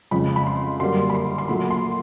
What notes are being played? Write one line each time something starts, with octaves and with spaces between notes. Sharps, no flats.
F2 C#3 F3 G#3 B5
B5
C6
F#2 D3 G3 A#3 C6
B5
C6
C6
A#2 F#3 A3 B5
C6